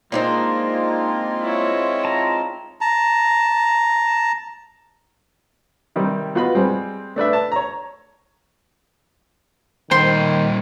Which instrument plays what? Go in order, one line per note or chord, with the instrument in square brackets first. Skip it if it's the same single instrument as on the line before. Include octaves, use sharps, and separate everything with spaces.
[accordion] G#3 C4 F4 [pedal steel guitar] A#3 [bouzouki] D4 D#4 C5
[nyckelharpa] E4 C#5
[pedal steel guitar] A5 A#5
[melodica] A5 A#5
[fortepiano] C3 D#3 G3
B3 F4 F#4 B4 D#5 B5
G3 G#3 C4
A3 D4 B4 E5
A5
C#5 A#5
[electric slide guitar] A#2 G3 G5 [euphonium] D#3 [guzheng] C5 C6